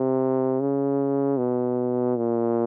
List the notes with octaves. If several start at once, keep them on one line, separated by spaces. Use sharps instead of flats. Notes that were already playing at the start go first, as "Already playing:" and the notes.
Already playing: C3
C#3
B2
A#2